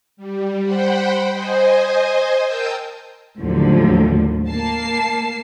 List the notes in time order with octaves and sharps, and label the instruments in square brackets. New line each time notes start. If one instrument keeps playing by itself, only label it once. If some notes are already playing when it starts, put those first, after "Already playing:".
[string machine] G3
C5 F#5 G5 B5
C5 D#5 G#5
A#4 G5 A5 D#6 E6 G6
[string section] D#2 A2 D3 F3 F#3
A#3 A5 C7